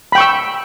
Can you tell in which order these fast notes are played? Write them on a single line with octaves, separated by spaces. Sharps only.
B5 G5 C#6 E6